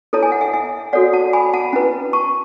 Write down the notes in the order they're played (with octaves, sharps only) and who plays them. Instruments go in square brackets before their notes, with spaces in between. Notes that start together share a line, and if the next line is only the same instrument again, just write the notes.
[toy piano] E4 A4 C#5 A5
G#5
F#5
E5 G#5
E5 G#5
F#4 A4 C#5 D5 F#5
F#5 A5
G#5 B5
F#5 A5
C#4 E4 B4
A5 C#6